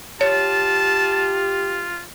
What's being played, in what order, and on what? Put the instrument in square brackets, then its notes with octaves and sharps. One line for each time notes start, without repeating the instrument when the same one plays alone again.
[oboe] F4 [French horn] G4 [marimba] C#5 [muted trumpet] A5